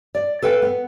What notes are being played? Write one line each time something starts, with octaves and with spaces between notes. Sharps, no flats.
D5
A4 B4 F5 G5
B3